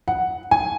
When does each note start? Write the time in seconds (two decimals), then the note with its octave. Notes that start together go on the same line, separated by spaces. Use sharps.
0.08 F#5
0.51 G#5